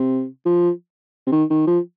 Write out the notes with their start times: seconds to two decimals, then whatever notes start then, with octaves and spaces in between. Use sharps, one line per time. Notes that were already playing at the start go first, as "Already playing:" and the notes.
Already playing: C3
0.45 F3
1.27 C3
1.32 D#3
1.50 D#3
1.67 F3